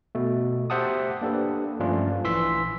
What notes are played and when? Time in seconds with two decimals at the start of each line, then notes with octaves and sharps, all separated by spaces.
0.15 B2 A3
0.70 G4 C5 E5 F#5 A5 D#6
1.21 A#3 D4 G4 A4 B4
1.80 G2 F3 A3 C#4 D4 F4
2.24 A#1 E3 C6 E6 B6